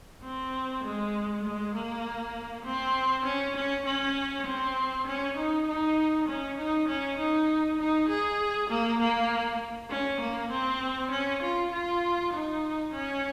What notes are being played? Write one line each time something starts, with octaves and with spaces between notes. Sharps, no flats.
C4
G#3
G#3
A#3
C4
C#4
C#4
C#4
C4
C#4
D#4
D#4
C#4
D#4
C#4
D#4
D#4
G#4
A#3
A#3
C#4
A#3
C4
C#4
F4
F4
D#4
C#4